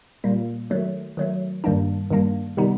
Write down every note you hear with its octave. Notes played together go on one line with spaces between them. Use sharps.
A#2 G3 A#3
D#3 F#3 A3
D#3 F#3 A3
G2 D#3 G3 A#3 D4
G2 D#3 G3 A#3 D4
C3 D#3 G3 B3 D#4